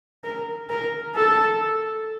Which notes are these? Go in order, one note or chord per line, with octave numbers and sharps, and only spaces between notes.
A#4
A#4
A4